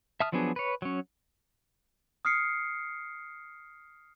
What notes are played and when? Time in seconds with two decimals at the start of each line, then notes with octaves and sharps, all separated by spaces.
0.20 E5 A5 D#6 F6
0.32 F3 F#3 B3 D4 G#4
0.56 B4 C#5
0.82 F#3 C#4
2.25 D#6 F6 C7 C#7